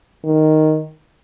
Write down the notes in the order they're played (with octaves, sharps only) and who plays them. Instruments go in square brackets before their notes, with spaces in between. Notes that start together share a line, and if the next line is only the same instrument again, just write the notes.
[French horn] D#3